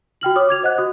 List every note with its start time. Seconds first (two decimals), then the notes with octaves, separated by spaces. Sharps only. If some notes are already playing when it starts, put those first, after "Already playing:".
0.21 F#4 G5 F6 F#7
0.36 F#4 C#5 D6 D#6 F6
0.49 D6 G#6 F7
0.63 C5 D#5 F#5 F#6
0.78 F#4 D#6